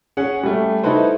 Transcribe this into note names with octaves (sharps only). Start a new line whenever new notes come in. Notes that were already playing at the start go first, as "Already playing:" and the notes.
C#4 G#4 F#5
G3 A3
D#4 E4 F#4 A4 B4 C5